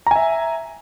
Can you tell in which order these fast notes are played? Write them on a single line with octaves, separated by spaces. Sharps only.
A#5 G#5 E5